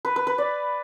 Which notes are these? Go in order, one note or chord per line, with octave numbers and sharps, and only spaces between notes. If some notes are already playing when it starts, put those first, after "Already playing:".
B4
B4
B4
D5